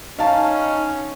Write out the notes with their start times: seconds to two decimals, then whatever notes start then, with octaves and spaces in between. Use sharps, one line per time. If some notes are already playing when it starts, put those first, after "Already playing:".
0.19 C#4 D#4 F5 A5